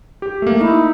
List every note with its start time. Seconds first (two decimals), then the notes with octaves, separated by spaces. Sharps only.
0.22 G4
0.42 A3 A#3
0.61 D#4 E4